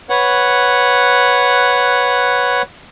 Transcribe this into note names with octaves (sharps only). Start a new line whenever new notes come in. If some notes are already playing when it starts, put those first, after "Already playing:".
B4 C#5 F#5